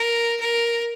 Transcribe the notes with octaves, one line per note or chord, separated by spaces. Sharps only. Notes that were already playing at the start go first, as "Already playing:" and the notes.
Already playing: A#4
A#4